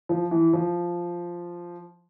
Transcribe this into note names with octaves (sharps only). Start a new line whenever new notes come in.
F3
E3
F3